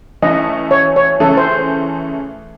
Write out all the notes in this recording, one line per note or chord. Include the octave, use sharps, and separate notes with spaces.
E3 A3 C#4 E4 D#5
C#5
C#5
C#3 E3 A3 C#4 A4
C5